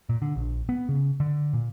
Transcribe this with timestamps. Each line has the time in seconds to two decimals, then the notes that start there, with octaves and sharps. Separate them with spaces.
0.09 A#2
0.22 D3
0.36 A#1
0.69 B3
0.89 C#3
1.20 D3
1.53 A#2